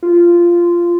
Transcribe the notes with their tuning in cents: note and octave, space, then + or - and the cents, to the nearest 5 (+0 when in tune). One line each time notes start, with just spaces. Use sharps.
F4 -10